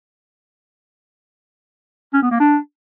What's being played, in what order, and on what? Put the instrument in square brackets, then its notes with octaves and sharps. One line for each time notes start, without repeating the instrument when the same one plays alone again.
[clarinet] C#4
B3
A#3
D4